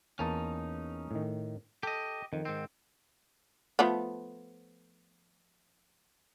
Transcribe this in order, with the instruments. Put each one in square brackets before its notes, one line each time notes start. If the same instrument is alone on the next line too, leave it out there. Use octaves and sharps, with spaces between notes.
[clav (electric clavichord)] E2 A#3 A5 [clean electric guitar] C#4 D#4
[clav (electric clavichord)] A2 D#3
[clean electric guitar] G4 D#5 [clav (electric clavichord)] A4
[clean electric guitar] F2 [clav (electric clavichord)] D#3
[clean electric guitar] G#2 C4
[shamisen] F3 A3 B3